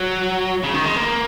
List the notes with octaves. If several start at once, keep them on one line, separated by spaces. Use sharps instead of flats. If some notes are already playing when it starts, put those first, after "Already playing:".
Already playing: F#3
C#3
D#3
G#3
A#3